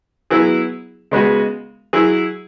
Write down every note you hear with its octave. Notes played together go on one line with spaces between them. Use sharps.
F#3 B3 E4 G#4
C#3 G#3 B3 F#4
F#3 E4 G#4